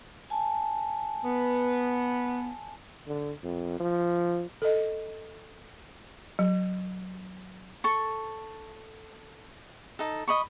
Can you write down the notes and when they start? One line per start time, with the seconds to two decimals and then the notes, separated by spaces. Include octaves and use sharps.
0.30 G#5 A5
1.25 B3
3.07 D3
3.44 F2
3.80 F3
4.62 A4 D#5
6.39 F#3
7.84 A4 C#6
9.99 D#4 A4
10.28 D#5 B5 C#6